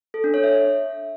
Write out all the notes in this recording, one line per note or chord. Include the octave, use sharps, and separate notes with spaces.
A4
D4
C#5
E5